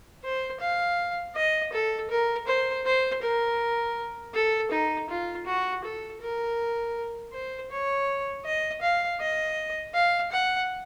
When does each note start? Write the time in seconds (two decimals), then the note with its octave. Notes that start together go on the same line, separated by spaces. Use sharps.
0.24 C5
0.61 F5
1.36 D#5
1.73 A4
2.10 A#4
2.47 C5
2.86 C5
3.22 A#4
4.34 A4
4.71 D#4
5.09 F4
5.47 F#4
5.84 A4
6.21 A#4
7.33 C5
7.71 C#5
8.45 D#5
8.82 F5
9.20 D#5
9.94 F5
10.32 F#5